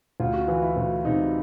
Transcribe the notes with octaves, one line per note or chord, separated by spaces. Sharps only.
D2 F4
F#4
E3 F4
E4
D2
C3 D#4